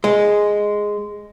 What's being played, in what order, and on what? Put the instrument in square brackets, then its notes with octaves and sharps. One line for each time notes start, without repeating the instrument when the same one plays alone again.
[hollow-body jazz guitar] G#3